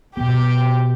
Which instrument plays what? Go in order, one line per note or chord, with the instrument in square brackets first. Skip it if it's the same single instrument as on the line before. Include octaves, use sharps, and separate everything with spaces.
[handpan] B2 B3 [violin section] G4